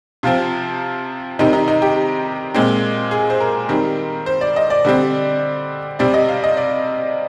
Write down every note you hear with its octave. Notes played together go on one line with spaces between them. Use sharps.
C3 F3 C4 F4
C3 D#3 G3 C4 D#4
D#4
D#4
G4
A#2 G#3 C4
G#4
C5
A#4
D#3 G3 C4
C5
D5
D#5
D5
D3 G3 C4
C3 G3 C4 D5
D#5
F5
D#5
D5